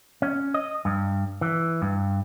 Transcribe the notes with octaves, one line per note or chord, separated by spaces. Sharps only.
C#4
D#5
G2
E3
G2